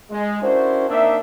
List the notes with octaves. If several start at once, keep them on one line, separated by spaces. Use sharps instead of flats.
G#3
C#4 D4 E4 F#4 A#4 C5
A#3 C4 D4 D#4 A#4 E5